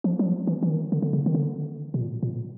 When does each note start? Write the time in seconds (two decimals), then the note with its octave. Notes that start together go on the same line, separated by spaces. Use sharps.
0.04 F3
0.19 F#3
0.26 F3
0.47 E3
0.63 E3
0.69 D#3
0.92 D3
1.02 D3
1.13 C#3
1.26 D#3
1.35 D3
1.94 B2
2.00 A#2
2.23 A#2